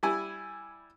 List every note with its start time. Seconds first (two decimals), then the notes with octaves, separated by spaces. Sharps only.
0.03 G3 E4 G#5